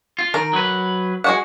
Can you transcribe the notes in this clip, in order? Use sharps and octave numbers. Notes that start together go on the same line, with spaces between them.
F4
D#3 A#4
F#3 B4
G#3 F#4 F#5